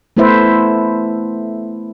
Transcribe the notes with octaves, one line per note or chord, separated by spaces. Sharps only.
A3 B3 E4 B4 C5 E5